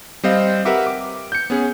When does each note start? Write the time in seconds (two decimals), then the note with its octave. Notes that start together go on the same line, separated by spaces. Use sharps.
0.23 G3 C4 C5 D#5 F5
0.65 G4 A#4 B4 E5 F#5 D6
0.87 D6
1.32 G6 C#7
1.50 B3 C#4 G#4